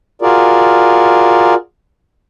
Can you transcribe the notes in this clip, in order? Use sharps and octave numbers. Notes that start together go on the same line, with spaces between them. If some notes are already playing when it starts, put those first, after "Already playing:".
F4 F#4 G#4 A#4 D5